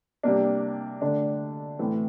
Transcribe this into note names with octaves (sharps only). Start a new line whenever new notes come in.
C3 G3 A#3 D4
D3 A3 D4
A2 E3 A3 C4